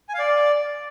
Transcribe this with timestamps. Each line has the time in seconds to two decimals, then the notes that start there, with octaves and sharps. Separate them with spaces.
0.09 G#5
0.14 F5
0.19 D5